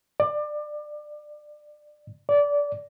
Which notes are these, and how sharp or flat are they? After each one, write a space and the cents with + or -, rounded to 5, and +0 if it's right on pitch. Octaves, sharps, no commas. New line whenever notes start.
D5 +25
D5 -20